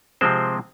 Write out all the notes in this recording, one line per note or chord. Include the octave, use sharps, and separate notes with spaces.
C3 F3 G#3 C4 C5